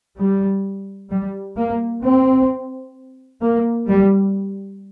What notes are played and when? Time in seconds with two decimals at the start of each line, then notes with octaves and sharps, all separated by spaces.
0.19 G3
1.11 G3
1.57 A#3
2.03 C4
3.41 A#3
3.88 G3